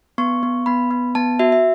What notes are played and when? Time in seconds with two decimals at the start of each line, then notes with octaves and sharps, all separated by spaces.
0.18 B3 C#6
0.43 B3
0.66 B3 B5
0.91 B3
1.15 B3 A5
1.39 F#4 E5
1.52 E5